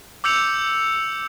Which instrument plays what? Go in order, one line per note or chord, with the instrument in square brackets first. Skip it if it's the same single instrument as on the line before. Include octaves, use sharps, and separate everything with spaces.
[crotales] D6 E6 G6 C#7 F7